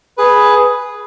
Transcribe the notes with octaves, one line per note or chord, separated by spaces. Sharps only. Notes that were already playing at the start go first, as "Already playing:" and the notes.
G#4 B4